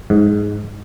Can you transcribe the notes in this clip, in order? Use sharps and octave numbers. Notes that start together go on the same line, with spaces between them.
G#2